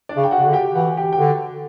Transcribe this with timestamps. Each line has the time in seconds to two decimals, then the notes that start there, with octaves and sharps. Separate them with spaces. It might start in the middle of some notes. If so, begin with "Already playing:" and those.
0.09 D4 D5
0.17 C#3
0.24 G5
0.31 F#4 F#5
0.39 C#3
0.46 D3
0.53 G4 G5
0.75 E3 F#4 F#5
0.97 G4 G5
1.13 G5
1.18 D3 F#4 F#5